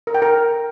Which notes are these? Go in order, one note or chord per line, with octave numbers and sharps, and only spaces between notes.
A#4
G5
A#4